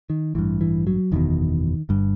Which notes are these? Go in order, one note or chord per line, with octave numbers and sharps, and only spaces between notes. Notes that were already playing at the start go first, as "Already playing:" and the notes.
D#3
A1 G2 E3
E3
F#3
F#1 E2 B2 D#3
G1 G2